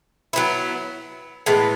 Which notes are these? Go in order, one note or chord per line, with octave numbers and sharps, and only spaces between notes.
F#3 B3 E4
A2 E3 G#3 B3